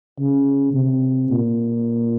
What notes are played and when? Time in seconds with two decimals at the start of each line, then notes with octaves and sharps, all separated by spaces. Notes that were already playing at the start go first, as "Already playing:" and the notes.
0.19 C#3
0.74 C3
1.30 A#2